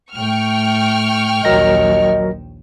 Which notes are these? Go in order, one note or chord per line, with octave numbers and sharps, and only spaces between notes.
A2 A3 G5 C#6 F6
A#1 D#2 F#3 A#4 D#5 A#6